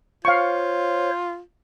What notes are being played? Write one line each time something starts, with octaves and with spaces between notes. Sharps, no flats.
F4 C5 C#5 F5 C#6